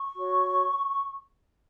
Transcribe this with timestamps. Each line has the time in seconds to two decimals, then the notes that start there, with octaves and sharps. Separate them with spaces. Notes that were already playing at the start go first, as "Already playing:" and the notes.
Already playing: C#6
0.16 F#4 C#5